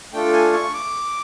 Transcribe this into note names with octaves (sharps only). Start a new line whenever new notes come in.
A3 D4 F4 A4 G5
G#5
C#6
D6